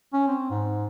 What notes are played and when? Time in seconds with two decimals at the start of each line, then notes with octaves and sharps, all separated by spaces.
0.13 C#4
0.27 C4
0.50 G#2